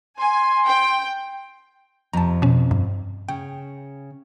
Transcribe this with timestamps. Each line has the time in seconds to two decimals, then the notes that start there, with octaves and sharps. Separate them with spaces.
0.19 G#5 C6
0.66 G5
2.13 F2 C3 A5 A#5
2.42 B2 C#4
2.71 G2
3.29 C#3 G5